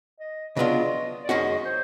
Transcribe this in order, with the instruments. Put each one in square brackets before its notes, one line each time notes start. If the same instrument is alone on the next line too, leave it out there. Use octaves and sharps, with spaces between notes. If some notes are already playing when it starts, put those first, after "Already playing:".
[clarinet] D#5
[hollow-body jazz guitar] C#3 F#3 B3 D4 F4 [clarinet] D#5
[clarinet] D5
[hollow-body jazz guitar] F#2 D#3 G#3 C#4 F#4 [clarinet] D#5
[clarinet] C5